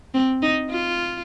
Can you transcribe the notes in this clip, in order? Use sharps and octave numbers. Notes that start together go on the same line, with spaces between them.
C4
D#4
F4